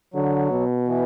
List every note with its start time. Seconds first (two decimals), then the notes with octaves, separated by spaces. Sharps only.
0.14 D3 F#3
0.51 B2
0.87 E3